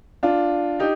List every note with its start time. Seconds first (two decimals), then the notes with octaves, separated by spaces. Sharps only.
0.23 D4 F4
0.79 D#4 G4